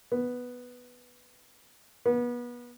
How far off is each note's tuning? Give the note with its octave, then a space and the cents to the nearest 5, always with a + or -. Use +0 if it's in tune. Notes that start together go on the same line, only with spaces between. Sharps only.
B3 +0
B3 -30